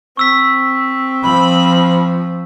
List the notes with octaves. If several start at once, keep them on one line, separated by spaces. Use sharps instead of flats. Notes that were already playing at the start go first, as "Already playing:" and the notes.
C4 C#6 E6 B6
F3 B5